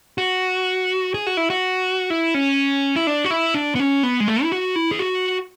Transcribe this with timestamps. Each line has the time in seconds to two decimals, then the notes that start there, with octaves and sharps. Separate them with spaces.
0.18 F#4
1.14 G#4
1.27 F#4
1.37 E4
1.50 F#4
2.10 E4
2.34 C#4
2.96 E4
3.07 D4
3.25 F#4
3.31 E4
3.54 D4
3.75 B3
3.80 C#4
4.03 B3
4.20 G#3
4.28 A3
4.43 E4
4.52 F#4
4.76 E4
4.91 G#4
4.99 F#4